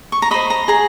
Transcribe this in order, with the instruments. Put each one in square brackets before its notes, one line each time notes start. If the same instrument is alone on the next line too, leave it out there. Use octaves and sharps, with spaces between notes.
[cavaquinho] C#6
A#5
C5 D#5 B5
A#5
G#4 A#5